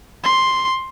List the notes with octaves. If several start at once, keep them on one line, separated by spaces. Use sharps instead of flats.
C6